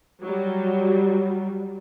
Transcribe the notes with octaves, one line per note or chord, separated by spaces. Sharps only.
F#3 G3